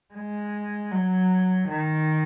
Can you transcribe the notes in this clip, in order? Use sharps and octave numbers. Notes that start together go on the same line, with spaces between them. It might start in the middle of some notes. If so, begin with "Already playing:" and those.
G#3
F#3
D#3